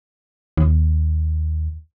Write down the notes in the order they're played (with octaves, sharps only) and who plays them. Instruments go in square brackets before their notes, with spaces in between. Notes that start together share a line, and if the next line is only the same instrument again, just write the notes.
[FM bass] D#2